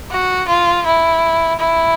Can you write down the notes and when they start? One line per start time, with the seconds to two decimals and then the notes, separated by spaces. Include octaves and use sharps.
0.11 F#4
0.48 F4
0.86 E4
1.59 E4